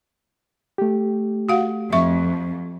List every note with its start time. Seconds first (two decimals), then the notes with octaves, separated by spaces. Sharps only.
0.78 A3 G4
1.49 F#4 F5 F#5
1.93 F2 E5 C#6